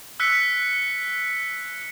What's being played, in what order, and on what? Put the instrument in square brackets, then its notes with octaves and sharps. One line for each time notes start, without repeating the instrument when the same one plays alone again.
[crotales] E6 F#6 B6 C#7